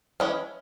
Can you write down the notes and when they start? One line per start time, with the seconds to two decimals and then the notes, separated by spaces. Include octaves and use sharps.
0.20 E3 G#3 C#4